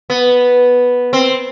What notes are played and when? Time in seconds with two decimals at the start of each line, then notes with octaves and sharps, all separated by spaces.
0.10 B3
1.13 C4